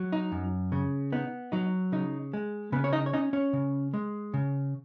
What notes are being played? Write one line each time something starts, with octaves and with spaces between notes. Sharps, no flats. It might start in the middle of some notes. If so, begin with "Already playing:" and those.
Already playing: F#3
D#4
F#2
C#3
B3 D#4
F#3 D#4
C#3 D#4
G#3
C#3 B3 B4
C#5
D#4 D#5
C#5
C#4 D#4 D#5
C#4 C#5
C#3
G#3
C#3